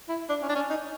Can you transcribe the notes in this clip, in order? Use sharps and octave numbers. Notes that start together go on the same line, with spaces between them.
E4
D4
C#4
D4
C#4
D#4